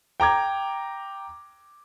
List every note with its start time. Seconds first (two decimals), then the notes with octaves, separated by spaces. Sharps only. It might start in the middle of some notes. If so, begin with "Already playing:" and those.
0.20 G5 A#5 D6 G#6